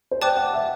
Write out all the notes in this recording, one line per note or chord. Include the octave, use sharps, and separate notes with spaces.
C5
D5 G5 A5 D6 F#6
F#5
E5